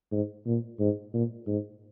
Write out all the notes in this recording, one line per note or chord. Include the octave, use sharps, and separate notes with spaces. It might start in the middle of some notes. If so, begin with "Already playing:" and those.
G#2
A#2
G#2
A#2
G#2